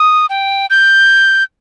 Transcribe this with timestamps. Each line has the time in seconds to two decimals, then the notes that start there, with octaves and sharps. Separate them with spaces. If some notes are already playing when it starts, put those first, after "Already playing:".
Already playing: D#6
0.30 G5
0.70 G6